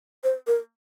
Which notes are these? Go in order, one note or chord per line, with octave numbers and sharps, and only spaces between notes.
C5
A#4